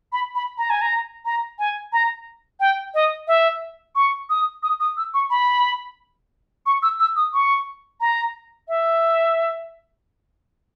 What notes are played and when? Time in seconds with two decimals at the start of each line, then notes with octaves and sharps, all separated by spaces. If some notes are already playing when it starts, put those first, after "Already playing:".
0.13 B5
0.35 B5
0.58 A#5
0.70 G#5
0.81 A#5
1.25 A#5
1.59 G#5
1.93 A#5
2.60 G5
2.94 D#5
3.28 E5
3.95 C#6
4.30 D#6
4.63 D#6
4.80 D#6
4.97 E6
5.14 C#6
5.30 B5
6.66 C#6
6.83 E6
7.00 E6
7.16 D#6
7.34 C#6
8.01 A#5
8.68 E5